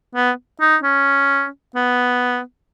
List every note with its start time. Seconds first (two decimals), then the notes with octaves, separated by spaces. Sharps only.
0.15 B3
0.61 D#4
0.83 C#4
1.76 B3